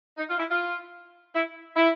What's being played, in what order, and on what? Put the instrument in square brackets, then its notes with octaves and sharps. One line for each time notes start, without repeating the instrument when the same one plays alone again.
[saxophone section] D#4
F4
E4
F4
E4
E4